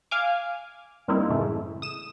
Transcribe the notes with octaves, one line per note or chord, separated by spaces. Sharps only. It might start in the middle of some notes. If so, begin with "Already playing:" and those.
F5 G#5 D6
G2 G3 A#3 C4 D#4 E4
F#2 A2 C#3 E3 G#3 A3
D#6 E7